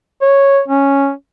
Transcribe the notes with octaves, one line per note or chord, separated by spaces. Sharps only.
C#5
C#4